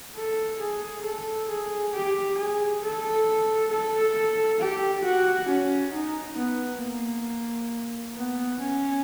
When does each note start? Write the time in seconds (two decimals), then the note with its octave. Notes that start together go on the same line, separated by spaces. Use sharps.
0.16 A4
0.60 G#4
1.05 A4
1.49 G#4
1.93 G4
2.38 G#4
2.83 A4
3.71 A4
4.60 G4
5.05 F#4
5.49 C#4
5.94 D#4
6.37 B3
6.82 A#3
8.16 B3
8.60 C#4